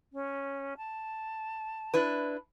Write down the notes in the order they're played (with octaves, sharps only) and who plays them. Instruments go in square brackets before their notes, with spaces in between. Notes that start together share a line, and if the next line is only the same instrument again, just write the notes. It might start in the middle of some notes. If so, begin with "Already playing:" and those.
[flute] C#4
A5
[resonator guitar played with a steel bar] D4 E4 B4